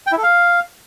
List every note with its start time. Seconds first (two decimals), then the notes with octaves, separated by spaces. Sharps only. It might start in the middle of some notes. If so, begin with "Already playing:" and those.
0.07 G5
0.12 E4
0.18 A4
0.23 F5